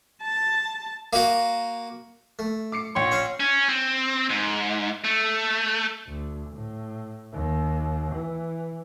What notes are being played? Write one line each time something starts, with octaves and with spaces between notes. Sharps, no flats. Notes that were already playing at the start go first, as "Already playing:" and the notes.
A5
A#3 F#4
A3
D6 C7 C#7
A#1 C#5 G5 C6
C#4 C5
C#4
C4
G#2
A3
D2
A2
D#2
E3